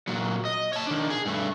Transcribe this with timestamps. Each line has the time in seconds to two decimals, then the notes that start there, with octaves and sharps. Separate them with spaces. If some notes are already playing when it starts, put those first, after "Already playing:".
0.08 A#2 F#3
0.45 D#5
0.73 C#5 A5
0.87 D#3 D4
1.10 G#4
1.26 G2 A3